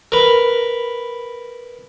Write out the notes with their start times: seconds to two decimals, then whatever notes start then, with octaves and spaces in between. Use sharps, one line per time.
0.12 A#4 B4